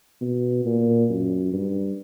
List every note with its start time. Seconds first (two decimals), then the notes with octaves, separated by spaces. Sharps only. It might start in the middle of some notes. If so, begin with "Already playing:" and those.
0.21 B2
0.65 A#2
1.10 F#2
1.52 G2